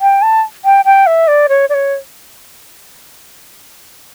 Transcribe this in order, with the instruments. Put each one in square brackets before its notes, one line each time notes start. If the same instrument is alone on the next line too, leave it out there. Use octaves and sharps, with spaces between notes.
[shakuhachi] G5
A5
G5
G5
E5
D5
C#5
D5
C#5